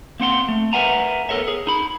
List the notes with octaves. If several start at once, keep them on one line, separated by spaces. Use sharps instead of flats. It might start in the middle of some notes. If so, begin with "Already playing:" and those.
A#3 C4 F#5 C6
A3
A#4 B4 E5 F#5 G#5 A#5
B3 A4 A#4 C#5 E5
G#4
D#4 B5